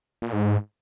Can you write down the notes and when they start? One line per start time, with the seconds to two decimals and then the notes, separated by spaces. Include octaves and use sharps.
0.22 A#2
0.33 G#2
0.44 G#2